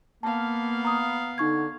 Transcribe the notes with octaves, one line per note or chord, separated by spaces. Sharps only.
A#3 B3 F5 A5
A#5 D#6
D3 D#4 C#6 G#6